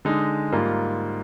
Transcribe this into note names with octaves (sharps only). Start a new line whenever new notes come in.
D3 G#3 D#4
G#2 G3 A#3 F4